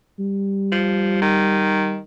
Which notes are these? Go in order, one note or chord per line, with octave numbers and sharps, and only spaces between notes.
G3
F3
D#3